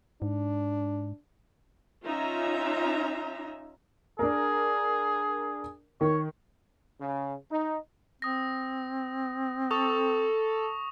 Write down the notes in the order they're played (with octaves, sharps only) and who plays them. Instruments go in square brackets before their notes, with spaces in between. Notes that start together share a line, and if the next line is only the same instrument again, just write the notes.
[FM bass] G#2 [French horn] D4
[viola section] C#4 D#4 F4 E5 A#5
[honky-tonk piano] D4 A#4 [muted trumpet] G#4
[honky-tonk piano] D#3 [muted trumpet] C#5
[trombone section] C#3
D#4
[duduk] C4 [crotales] D#6 A#6
[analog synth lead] A4 [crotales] C#6 D#6 F7